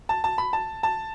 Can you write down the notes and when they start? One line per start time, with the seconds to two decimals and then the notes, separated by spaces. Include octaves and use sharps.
0.09 A5
0.24 A5
0.38 B5
0.53 A5
0.83 A5